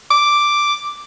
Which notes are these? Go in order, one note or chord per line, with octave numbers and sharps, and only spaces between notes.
D6